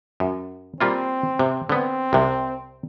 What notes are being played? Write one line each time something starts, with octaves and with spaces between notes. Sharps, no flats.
F#2
G3 A#3 C4 F4
C3
D3 B3 C4
C2 C3